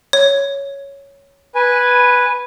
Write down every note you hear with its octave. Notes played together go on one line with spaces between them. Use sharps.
C#5
B4 G#5